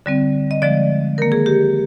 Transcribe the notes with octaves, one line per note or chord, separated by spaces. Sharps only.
D3 G3 C4
D#5
D3 F3 G#3 D5
D#3 A#3 A#4
G#4
G4